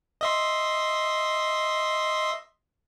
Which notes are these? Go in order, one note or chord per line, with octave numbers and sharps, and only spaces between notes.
D#5 E5 C6